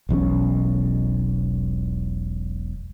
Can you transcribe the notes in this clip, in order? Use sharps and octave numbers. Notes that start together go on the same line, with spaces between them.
E1 B1 E2 C#4